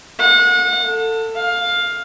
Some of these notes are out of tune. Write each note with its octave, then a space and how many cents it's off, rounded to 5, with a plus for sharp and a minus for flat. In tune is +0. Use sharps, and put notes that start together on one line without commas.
F#5 -35
A4 +25
F5 +15